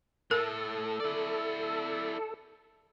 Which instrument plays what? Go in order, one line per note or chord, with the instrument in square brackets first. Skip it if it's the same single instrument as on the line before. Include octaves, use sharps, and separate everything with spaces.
[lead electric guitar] A2 A3 [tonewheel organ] A4 [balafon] A#4
[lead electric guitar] E4 D5